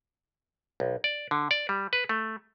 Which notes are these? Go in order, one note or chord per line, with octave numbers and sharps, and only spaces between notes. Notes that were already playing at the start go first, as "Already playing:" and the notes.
B1
D5
D3
D5
G3
B4
A3